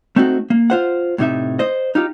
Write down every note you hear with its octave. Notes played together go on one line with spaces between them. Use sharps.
A3 C4 D#4 F#4
A#3
F4 C5 F#5
A2 C3 D#4 E5
C5 D#5
D#4 F4 G4